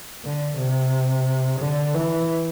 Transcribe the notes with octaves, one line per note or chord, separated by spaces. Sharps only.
D3
C3
D3
E3